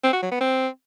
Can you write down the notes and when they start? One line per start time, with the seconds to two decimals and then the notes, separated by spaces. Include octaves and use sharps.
0.04 C4
0.13 F#4
0.22 F#3
0.31 B3
0.40 C4